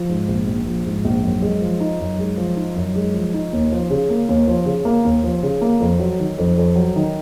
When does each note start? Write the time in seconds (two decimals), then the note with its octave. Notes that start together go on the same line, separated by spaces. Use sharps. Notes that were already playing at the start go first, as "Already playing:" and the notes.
Already playing: F3
0.09 G#2
0.28 A#1
0.47 A#1
0.66 F3
0.86 G#2
1.05 A#1
1.23 F#2
1.42 G#3
1.61 F3
1.80 D#4
2.00 F#2
2.19 G#3
2.37 F3
2.57 D#4
2.76 F#2
2.96 G#3
3.14 F3
3.34 D#4
3.53 D#2
3.72 F3
3.90 C#3
4.10 A#3
4.29 D#2
4.47 F3
4.66 C#3
4.85 A#3
5.05 D#2
5.23 F3
5.43 C#3
5.61 A#3
5.80 F2
5.99 F#3
6.20 D#3
6.38 F2
6.57 F2
6.76 F#3
6.96 D#3